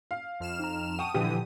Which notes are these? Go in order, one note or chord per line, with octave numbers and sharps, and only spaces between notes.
F5
F2 F6 E7
D#4 A#5
F#5 G5 A5 C#6 D#6 D#7
A#2 D3 E3 F3 G4 D#6 D#7